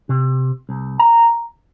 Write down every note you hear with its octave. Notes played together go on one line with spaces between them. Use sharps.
C3
C2
A#5